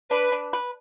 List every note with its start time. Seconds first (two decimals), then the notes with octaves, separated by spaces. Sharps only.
0.11 D4 B4
0.32 D4
0.53 B4